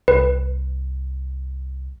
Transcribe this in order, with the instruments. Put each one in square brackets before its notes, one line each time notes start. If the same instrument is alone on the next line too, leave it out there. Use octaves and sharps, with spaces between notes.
[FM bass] C2 [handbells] B4